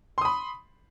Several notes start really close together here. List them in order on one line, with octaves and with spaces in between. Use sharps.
C6 D#6 B5